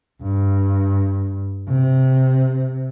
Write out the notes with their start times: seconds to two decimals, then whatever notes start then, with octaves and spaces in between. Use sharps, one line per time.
0.23 G2
1.68 C3